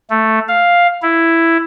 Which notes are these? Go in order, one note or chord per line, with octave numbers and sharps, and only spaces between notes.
A3
F5
E4